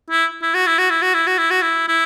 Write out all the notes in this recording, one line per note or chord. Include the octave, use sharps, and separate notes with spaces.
E4
E4
F#4
E4
F#4
E4
F#4
E4
F#4
E4
F#4
E4
E4